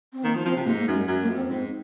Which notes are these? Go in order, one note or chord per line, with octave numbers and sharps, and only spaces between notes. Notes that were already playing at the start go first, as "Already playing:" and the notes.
C4
D#3 A#3
F3
F3 C4
C3
G#2 A#3
A#3
F#2
G#3
F#2
A#3
F2
C4
G#2 C4